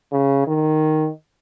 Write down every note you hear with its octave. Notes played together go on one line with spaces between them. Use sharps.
C#3
D#3